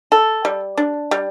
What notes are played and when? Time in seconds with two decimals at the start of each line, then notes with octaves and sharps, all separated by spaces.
0.12 A4
0.45 G3
0.77 D4
1.11 G3